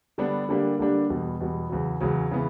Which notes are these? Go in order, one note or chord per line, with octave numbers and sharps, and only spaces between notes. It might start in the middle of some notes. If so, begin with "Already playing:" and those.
D3 G3 B3 D4
D3 G3 A#3 D4 G4
D3 G3 A#3 D4 G4
E2 B2 G3 B3
E2 B2 G3 B3
E2 C#3 F#3
E2 C#3 F#3
C#3 E3 B3